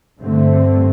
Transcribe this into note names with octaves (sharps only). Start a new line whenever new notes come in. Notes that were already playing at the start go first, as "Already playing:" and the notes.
G2 D3 A3 C4